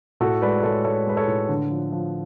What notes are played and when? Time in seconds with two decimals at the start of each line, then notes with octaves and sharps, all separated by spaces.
0.20 A2 F#4 A4
0.42 G#3 B4 D5
0.63 G#3 A4 C#5
0.84 G#3 A4 C#5
1.07 G#3 B4
1.17 A4 C#5
1.28 A2
1.49 D3
1.70 F3
1.92 F3